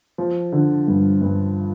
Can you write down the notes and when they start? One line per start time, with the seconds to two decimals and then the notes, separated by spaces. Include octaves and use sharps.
0.18 F3
0.53 D3
0.88 G2
1.22 G2